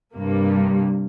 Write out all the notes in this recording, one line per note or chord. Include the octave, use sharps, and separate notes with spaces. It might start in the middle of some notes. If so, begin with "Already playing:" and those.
G2 C3 A#3